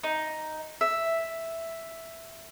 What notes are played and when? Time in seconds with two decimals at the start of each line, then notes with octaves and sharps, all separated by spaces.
0.04 D#4
0.81 E5